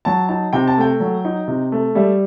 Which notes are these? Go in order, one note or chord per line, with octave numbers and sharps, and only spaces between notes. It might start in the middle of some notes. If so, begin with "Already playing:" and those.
F#3 A5
D#4 A5
C3 G5
A5
A3 G5
F#3
D#4
C3
A3
G3 E5